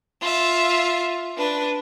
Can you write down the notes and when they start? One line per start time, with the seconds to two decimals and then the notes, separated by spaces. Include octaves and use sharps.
0.21 F4 E5
1.38 D4 B4